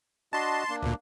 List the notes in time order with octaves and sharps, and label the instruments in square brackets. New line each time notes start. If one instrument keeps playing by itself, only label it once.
[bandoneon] D4 F#4 D#5 [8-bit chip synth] A5 C6
[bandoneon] A#3 D4
[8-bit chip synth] D2 A#2